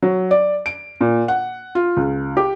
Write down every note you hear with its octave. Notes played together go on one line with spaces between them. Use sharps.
F#3
D5
D7
A#2
F#5
F4
C#2
G4